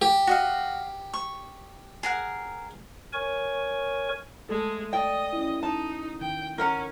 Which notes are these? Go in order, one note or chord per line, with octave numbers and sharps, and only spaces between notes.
G4
F#4 D#5 F5
C#6
G#4 A#4 F#5
A#4 C#5 G#5 C#6
G#3 A3 A4
D5 D#5 G5
C#4 E4
D#4 A5
D#3 G5
C#4 A#4 F#5 A#5